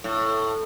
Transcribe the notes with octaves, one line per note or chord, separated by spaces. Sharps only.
A2